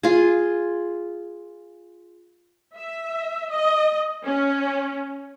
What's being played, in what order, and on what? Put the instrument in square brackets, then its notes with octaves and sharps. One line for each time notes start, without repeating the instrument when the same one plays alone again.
[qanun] F4 G#4
[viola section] E5
D#5
C#4